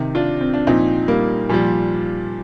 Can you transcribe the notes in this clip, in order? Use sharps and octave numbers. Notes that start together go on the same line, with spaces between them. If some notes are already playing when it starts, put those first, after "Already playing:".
Already playing: C3 D#3
D4 F4
C4
D4
A#2 F3 C4 D#4
G3 A#3
A#2 F3 G3